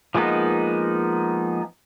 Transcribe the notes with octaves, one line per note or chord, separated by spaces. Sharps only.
F3 G#3 A#3 B3 D#4